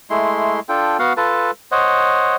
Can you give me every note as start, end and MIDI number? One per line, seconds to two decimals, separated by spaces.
0.10 0.60 56
0.10 0.60 57
0.10 0.60 64
0.10 0.60 84
0.69 0.97 62
0.69 0.97 65
0.69 0.97 69
0.69 0.97 79
0.99 1.13 59
0.99 1.13 66
0.99 1.13 77
0.99 1.13 78
1.17 1.51 65
1.17 1.51 69
1.17 1.51 71
1.17 1.51 81
1.71 2.36 72
1.71 2.36 73
1.71 2.36 75
1.71 2.36 78